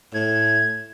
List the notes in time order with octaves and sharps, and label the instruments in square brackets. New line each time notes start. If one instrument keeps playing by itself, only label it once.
[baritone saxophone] A2 [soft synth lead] G#6